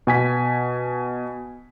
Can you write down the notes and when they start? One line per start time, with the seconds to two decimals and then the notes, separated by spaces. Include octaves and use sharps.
0.07 B2 G#5 B6